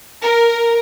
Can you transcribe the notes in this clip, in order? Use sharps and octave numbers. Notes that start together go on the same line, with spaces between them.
A#4